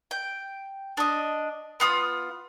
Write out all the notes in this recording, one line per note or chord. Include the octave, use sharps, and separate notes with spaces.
G5
D4 D#5
B3 F4 D#6